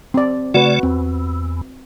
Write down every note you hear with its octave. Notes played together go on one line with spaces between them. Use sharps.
C4 D5
C#3 A3 F#4 B4 D5
E2 C4